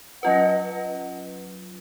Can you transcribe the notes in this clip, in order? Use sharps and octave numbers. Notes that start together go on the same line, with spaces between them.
F#3 C#4 F4 B4 D#5 F#5